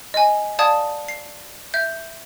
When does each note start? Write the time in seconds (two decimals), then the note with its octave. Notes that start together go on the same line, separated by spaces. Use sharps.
0.14 D#5 G#5
0.59 D5 F5 A5 D#6 G#6
1.08 C7
1.74 E5 G6